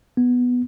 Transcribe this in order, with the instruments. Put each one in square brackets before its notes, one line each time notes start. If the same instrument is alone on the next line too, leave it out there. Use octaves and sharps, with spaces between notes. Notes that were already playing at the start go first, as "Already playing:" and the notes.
[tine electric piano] B3